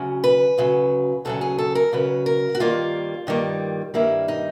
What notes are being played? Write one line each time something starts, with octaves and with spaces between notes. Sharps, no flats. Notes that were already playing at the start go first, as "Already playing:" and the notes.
Already playing: D2 C#3 F#3
B4
D2 C#3 F#3
D2 C#3 F#3 A4
G#4
A4
A#4
D2 C#3 F#3 B4
A#4
F#4
G2 D#3 G3 A#3 F4
G2 D#3 G3 A#3
G2 D#3 G3 A#3 E4
D#4